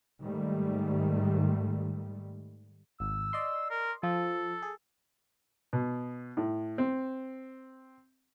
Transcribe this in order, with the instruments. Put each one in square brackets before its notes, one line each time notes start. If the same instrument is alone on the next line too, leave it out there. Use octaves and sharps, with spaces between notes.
[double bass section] G#2 D#3 G3 A3
[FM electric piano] G#1 [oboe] E6
[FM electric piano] D5 D#5 C6
[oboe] A#4
[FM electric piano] F3 [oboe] A4
[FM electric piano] G#4
[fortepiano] B2
A2
C4